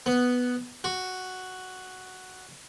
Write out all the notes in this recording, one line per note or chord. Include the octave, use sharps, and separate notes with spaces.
B3
F#4